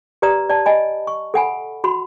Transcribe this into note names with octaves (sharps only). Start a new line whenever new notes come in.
G4 B4 D5 A#5 D#6
D5 A5
D#5 G#5 B5
C#6
A4 F#5 G#5 B5
F#4 B5 C6